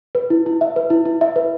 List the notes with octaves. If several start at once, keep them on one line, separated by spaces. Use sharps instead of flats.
B4
E4
E4
E5
B4
E4
E4
E5
B4